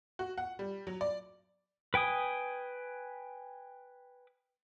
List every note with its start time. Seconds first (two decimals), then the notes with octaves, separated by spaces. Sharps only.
0.19 F#4
0.38 F#5
0.59 G3
0.87 F#3
1.01 D5
1.94 B4 G5 G#5 D#6